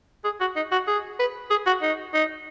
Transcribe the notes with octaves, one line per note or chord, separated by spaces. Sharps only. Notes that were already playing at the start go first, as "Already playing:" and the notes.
G#4
F#4
D#4
F#4
G#4
B4
G#4
F#4
D#4
D#4